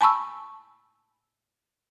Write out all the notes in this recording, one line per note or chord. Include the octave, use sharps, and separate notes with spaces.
G#5 A5 B5 C#6 E6